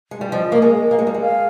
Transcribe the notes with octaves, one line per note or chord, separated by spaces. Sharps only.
G#3
G3
F3 D#5
A#3
G#3
A#3
G#3
G3
G#3
F5